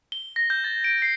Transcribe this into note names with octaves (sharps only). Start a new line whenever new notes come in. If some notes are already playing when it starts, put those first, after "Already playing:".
G7
A#6
G6
A6
D7
C7